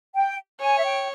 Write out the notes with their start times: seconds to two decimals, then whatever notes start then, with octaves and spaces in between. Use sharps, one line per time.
0.14 G5
0.60 C#5 G#5
0.77 E5
0.84 G5